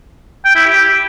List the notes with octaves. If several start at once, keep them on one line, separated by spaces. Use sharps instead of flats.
G5
E4
G4